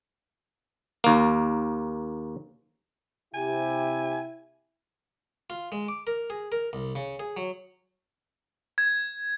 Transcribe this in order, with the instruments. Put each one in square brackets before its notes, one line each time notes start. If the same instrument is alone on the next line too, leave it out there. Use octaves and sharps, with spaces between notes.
[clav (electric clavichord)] D#2 A#3
[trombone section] C3 G4 [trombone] E4 [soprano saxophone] G#5
[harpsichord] F4
G#3
D6
A#4
G#4
A#4
C2
C#3
G#4
F#3
[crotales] G#6